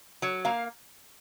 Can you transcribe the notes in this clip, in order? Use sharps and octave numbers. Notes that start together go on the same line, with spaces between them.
F#3 C#5
A#3 F5